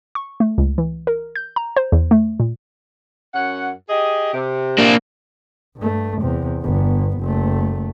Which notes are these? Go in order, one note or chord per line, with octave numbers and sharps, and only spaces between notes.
C#6
A3
C#2
E3
A#4
G6
A#5
C5
E2
A3
A#2
F#2 C#4 F#5
G4 G#4 D#5
C3
A#3 D4
G2 A3
E2 C3
G1 B3
F#1 A3